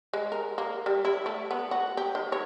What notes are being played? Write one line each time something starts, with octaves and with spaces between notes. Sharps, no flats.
G#3
A#4
A#3
G3
E4
A3
B3
F#4
G4
D#3
C#5